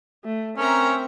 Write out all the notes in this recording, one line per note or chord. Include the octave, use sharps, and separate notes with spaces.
A3
C4 C#4 A#4 E5 A#5